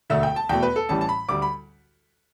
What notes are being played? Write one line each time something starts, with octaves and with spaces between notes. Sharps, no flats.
E1 D2 D3 A3 E5
G5
A5
E2 B2 A3 G5
B4
A4
A1 A2 E3 G3 A5
A5
B5
D2 D3 G3 D6
B5